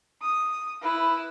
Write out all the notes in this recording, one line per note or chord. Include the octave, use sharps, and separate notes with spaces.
D#6
E4 B4